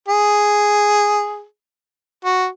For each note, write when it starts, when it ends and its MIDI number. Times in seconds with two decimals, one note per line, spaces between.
0.09 1.44 68
2.25 2.47 66